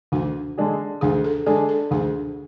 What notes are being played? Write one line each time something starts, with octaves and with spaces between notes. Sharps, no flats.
D2 F#4
D3 G#3 D4 G#4
D2 G#4
A4
D3 G#3 D4 G#4 A4
A4
D2 G#4